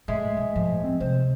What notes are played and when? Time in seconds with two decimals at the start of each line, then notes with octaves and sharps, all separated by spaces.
0.08 A2 G#3 E5
0.37 B1
0.55 A2 F3
0.83 C4
1.00 C3 C5